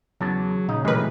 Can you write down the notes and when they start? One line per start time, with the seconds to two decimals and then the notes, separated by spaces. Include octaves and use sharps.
0.21 E2 C#3 F#3 A5
0.69 A#2 C#3 D#4
0.85 F#2 B2 E3 G#3 A3 G4 A#4 B4